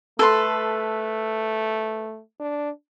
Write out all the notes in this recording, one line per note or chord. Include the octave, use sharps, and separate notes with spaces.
A3 A4 B4 C6
D4